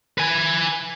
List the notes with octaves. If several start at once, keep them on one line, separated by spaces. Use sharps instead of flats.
B4 G#5